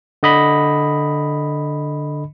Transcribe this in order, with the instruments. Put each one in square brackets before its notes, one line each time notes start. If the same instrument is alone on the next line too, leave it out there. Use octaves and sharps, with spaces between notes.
[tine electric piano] D3 D#5 B5